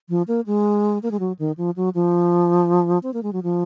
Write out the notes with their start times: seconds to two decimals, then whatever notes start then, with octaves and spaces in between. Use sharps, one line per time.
0.09 F3
0.28 A#3
0.46 G#3
1.03 A#3
1.11 G#3
1.20 F#3
1.39 D#3
1.57 F3
1.76 F#3
1.95 F3
3.03 C4
3.14 A#3
3.23 G#3
3.33 F#3
3.43 F3